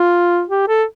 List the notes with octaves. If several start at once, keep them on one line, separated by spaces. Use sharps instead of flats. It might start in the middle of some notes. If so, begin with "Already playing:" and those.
Already playing: F4
G4
A4